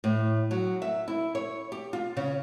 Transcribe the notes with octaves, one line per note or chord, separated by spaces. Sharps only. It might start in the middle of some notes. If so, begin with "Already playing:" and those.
A2
F#3
E5
E4
C#5
G4
F4
C#3